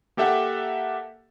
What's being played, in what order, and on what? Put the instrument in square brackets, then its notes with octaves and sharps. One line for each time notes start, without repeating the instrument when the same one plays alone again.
[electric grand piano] A#3 G4 A4 E5 F#5